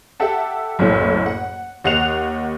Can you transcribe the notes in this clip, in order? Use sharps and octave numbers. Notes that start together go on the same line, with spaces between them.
G4 A4 E5 F#5 A5
F#1 B1 F#2 A2 E4
F#5
D#2 D#5 F#5 F#6 C7 F7